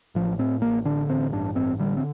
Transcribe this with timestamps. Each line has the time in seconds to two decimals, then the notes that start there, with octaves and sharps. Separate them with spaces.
0.15 A1 F3
0.39 A2 C4
0.62 A1 A#3
0.85 D3 D4
1.09 A1 C4
1.32 G2 D4
1.55 A1 C4
1.79 D3 G3
1.97 C4